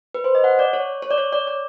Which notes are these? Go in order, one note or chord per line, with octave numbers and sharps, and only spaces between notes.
B4
C5
D#5
F#5
D5
C#5
C#5
D5
C#5
D5
D5